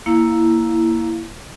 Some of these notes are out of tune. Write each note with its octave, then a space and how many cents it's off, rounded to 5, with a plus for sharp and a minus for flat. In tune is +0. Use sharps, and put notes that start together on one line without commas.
A#3 +0 E4 +0 F5 +0